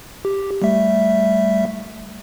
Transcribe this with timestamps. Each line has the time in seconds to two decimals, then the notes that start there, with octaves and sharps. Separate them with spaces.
0.25 G4
0.62 G3 A3 E5